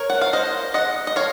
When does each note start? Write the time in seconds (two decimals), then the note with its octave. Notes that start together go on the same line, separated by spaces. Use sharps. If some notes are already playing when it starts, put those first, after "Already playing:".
Already playing: A#4 C#5
0.10 F#5
0.21 F5
0.33 C5 D#5
0.74 D#5 F#5
1.07 D#5
1.16 C#5 F5